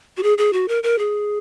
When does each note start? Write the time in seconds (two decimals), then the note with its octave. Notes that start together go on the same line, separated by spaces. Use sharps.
0.17 F#4
0.23 G#4
0.38 G#4
0.53 F#4
0.68 A#4
0.83 A#4
0.99 G#4